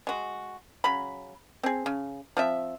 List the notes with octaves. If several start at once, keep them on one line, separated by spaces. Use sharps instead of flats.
G#3 F#4
C#3 F#3 B5
C4 G#4
C#3
F3 C4 E5